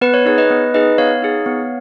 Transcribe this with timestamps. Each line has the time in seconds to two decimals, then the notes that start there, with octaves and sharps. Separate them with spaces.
0.01 B3 B4
0.14 C#5
0.25 D#4 G#4 C#5
0.38 B4 D#5
0.50 B3
0.74 D#4 G#4 B4 D#5
0.98 B3 C#5 F5
1.22 D#4 G#4
1.46 B3